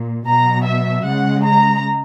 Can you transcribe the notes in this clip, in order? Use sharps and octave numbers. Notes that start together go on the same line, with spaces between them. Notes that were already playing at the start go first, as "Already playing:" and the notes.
Already playing: A#2
B2 F#3 A#5
E5
C#3 G#3 F#5
A#5